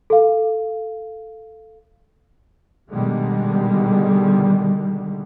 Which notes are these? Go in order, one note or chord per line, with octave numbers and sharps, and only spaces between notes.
A4 F5
B2 D3 D#3 G3 G#3